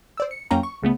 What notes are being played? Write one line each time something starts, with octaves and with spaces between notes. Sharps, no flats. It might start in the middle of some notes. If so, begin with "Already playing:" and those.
C5 D5 E6
C#7
F2 F#3 A#3 C#4 G5 A#5
C#6
C#2 C#3 A3 B3